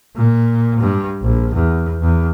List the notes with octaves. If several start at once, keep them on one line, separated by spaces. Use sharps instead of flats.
A#2
G2
A#1
E2
E2